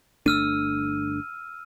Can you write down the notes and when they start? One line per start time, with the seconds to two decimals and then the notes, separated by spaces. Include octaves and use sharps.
0.26 G1 A3 D4 E6 F6 D#7